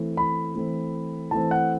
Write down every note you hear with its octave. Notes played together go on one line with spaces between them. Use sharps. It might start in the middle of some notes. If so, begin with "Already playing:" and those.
Already playing: E3 A3 C4
B5
E3 A3 C4
E3 A3 C4 A5
F#5